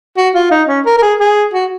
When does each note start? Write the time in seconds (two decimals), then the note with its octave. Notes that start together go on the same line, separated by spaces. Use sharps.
0.17 F#4
0.35 F4
0.51 D#4
0.68 C#4
0.86 A#4
0.98 A#4
1.03 G#4
1.20 G#4
1.54 F#4